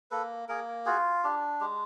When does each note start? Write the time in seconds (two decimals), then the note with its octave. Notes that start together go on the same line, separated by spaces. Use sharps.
0.11 A#3 A4 B4
0.49 A#3 G#4 A#4
0.86 F4 F#4 G#4
1.24 D4 G4
1.60 G#3 G4